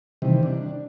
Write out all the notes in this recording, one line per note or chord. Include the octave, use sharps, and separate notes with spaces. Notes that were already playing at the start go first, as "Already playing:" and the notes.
C3 D#3 E3 G3
D4